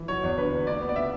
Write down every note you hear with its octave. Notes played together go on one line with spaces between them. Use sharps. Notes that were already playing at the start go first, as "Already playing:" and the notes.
Already playing: E3
F#3 C#5
E2
D3 B4
E2
D2 D5
B3
D5
C#3 E5